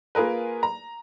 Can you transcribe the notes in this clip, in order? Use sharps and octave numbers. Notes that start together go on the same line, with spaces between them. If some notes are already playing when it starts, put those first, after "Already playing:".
A#3 F4 G#4 A#4 B4
A#5